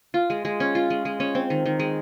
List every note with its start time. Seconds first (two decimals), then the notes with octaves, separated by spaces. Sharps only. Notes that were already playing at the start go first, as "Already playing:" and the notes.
0.14 F4
0.30 G#3
0.45 G#3
0.60 C#4
0.75 F4
0.90 G#3
1.05 G#3
1.20 C#4
1.35 C4
1.50 D#3
1.66 D#3
1.79 G#3